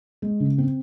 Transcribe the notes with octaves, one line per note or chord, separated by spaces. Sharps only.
G#3
C#3
C4